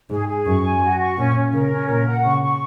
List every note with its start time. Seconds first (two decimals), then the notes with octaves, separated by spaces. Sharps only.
0.10 G#2 G#4
0.28 G#4
0.46 F#2 C#6
0.64 G#5
0.82 F#4
1.00 C#6
1.17 A#2 C#4
1.35 C#4
1.53 C#3 A#4
1.72 C#4
1.89 A#2 A#4
2.07 F#5
2.25 C#3 C#6
2.43 C#6